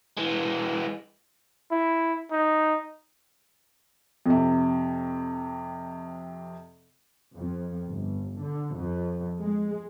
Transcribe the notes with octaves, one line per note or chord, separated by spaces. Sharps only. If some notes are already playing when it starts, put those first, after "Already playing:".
E3 G#3
E4
D#4
F2 C3
F2
G1
D3
F2
G#3